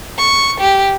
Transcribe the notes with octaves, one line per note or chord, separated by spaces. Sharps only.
C#6
G4